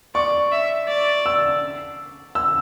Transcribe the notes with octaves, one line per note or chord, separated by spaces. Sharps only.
D5 C#6
E5
D5
E6
E6